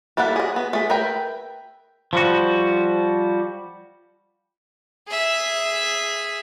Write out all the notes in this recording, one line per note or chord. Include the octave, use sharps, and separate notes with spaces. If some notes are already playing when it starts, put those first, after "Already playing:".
G3 A#3 E4 A4 F#5
G#4 D#5
B3
A3 G#4
A#4 B4 E5 G5
F3 G3 F#4
G#4 E5